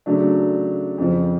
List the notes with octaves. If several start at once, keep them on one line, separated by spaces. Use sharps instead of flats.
C#3 F#3 A3 D4
F2 C#3 F3